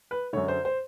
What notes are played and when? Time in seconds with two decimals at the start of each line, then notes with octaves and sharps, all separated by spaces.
0.11 B4
0.33 F#2 D3 C#5
0.48 C5
0.65 C5